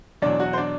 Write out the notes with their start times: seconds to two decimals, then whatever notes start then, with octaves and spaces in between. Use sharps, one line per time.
0.22 E2 B2 F#3 D4 D5
0.40 F#4 F#5
0.53 C5
0.58 D4 D5